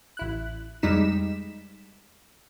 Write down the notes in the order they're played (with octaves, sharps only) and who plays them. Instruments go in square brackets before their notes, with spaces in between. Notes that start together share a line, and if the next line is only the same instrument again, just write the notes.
[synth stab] A1 E4 F#6
F2 G3 G#3 D#4 B6 E7